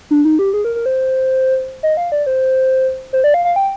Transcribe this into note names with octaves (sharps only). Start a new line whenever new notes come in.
D4
D#4
G4
G#4
A#4
A#4
C5
D#5
F5
D5
C5
C5
D5
F5
F5
G5